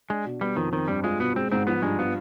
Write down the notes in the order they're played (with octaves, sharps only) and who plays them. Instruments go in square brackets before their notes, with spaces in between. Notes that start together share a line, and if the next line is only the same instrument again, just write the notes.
[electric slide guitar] G#3 [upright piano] D4
[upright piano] B2
[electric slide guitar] G3 [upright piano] B3
[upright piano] F2 [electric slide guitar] D#3
[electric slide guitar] D#3 [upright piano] C4
[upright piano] G2 [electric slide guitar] G3
[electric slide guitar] G#3 [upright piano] F4
[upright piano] B2 [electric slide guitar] B3
[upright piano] G#3 [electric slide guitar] C4
[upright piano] G#2 [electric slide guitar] C4
[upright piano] F3 [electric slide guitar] B3
[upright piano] G2 [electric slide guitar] G#3
[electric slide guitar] B3 [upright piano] F4